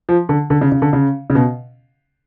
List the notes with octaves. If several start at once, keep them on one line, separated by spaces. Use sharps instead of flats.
F3
D3
D3
C#3
C#3
D3
C#3
C#3
B2